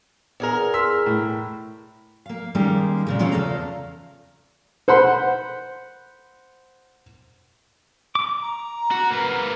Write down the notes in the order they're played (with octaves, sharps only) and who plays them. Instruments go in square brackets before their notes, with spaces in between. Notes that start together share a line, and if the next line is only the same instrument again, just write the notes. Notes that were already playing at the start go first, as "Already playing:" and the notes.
[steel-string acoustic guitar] E2 G#4 A#4
[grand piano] C6 E6 B6
A2
[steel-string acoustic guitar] A#3 F5
D#3 G3 G#3 A#3 C#4 D#4
A#2 C#3 G#3
E3 G#3 C4 C#4 F4 C#5
E2 G2 C#3 A4 F5 A#5
[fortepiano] C5 F#5 B5 C6
[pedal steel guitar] D6
[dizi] A#5
[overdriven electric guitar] F#4
A#3 B4